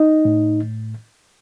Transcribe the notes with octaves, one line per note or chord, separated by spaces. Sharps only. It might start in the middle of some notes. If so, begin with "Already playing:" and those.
Already playing: D#4 D#5
A2